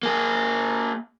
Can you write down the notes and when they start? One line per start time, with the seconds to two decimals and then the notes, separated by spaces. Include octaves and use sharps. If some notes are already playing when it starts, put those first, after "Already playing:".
0.03 A#3 G#4